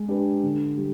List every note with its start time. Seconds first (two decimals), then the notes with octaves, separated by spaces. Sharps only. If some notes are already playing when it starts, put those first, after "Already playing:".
Already playing: G#3
0.08 D4 G4 B4
0.43 D3
0.78 G3